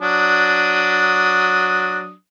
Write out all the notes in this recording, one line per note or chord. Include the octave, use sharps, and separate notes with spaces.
F#3 D4 D#6